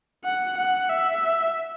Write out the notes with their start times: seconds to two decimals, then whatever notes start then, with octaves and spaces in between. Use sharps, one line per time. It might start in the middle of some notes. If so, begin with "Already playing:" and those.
0.25 F#5
0.58 F#5
0.90 E5